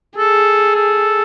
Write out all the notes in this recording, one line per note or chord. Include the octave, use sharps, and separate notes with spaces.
G#4 A4
A4